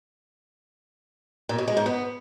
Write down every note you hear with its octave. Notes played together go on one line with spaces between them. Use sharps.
A#2
B2
G#3
G#2
B3